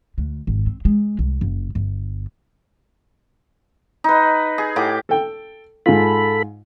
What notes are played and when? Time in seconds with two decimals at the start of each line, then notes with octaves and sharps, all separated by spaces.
0.18 D2
0.47 G#1
0.66 C4
0.85 G#3
1.19 C2
1.41 F#1
1.75 G1
4.04 D#4 B4
4.58 G#4
4.76 A2 G4 F#5 D6
5.09 A4 G5
5.86 G#2 F4 A4 B5